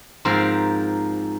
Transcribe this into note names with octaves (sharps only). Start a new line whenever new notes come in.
G#2 F3 C4 A#4